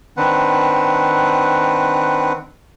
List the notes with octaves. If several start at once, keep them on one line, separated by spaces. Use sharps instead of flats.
D#3 C4 D4 B4 F#5